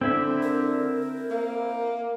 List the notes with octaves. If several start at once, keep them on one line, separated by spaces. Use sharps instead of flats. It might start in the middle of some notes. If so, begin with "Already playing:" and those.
D3 C4 E4 E5
A#4
A#3